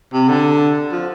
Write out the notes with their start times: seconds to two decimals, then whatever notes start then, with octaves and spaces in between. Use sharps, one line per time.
0.13 C3
0.29 D3
0.92 F3